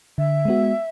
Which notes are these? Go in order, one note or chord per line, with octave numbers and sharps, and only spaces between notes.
D3 E5
G#3 B3 F#4